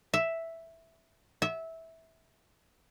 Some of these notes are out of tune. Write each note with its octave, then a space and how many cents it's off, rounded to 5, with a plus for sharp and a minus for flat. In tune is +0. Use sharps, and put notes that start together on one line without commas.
E5 +0
E5 -15